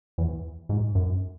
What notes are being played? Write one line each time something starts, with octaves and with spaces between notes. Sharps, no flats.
E2
G#2
F#2